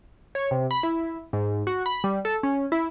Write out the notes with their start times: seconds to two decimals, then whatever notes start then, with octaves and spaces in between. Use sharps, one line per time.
0.35 C#5
0.51 C3
0.71 B5
0.83 E4
1.33 G#2
1.67 F#4
1.86 B5
2.04 G3
2.25 A4
2.43 C#4
2.72 E4